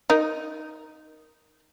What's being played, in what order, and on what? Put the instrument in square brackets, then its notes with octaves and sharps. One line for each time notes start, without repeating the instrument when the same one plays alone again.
[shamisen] D#4 A#4